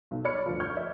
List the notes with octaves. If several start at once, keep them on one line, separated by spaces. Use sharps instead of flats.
B1
C#5 D5 B5 F6 C#7
D2 F3
C#6 F6 G6 G#6
D5 E5